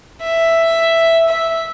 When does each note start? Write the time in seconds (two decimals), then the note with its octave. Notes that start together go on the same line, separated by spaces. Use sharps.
0.21 E5
1.28 E5